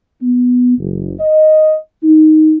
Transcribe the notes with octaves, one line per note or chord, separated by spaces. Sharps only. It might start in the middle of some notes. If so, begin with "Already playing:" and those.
B3
F#1
D#5
D#4